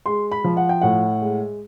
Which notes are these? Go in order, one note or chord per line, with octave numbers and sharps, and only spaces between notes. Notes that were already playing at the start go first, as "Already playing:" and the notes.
G#3 C6
B5
F3
F#5
G5
A2 F#5
G#3